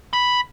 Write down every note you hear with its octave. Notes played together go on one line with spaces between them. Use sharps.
B5